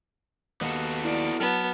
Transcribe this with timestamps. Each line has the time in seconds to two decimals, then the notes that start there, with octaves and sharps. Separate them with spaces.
0.61 D#2 B3 F#4 A4
1.05 E4 D5
1.40 F#3 B3 A5 F6